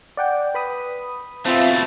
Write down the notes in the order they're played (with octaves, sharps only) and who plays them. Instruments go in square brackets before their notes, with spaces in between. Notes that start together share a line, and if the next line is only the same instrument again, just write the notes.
[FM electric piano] D5 F#5 G5
B4 B5 D#6
[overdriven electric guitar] B2 A3 [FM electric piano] C4 F4 E5